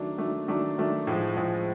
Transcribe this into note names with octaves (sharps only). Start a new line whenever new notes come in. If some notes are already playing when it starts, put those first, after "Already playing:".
Already playing: D#3 F#3 A3 D4
D#3 F#3 A3 D4
D#3 F#3 A3 D4
D#3 F#3 A3 D4
A2 F3 G#3
A2 F3 G#3